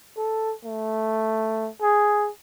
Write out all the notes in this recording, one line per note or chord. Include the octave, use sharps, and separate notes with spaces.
A4
A3
G#4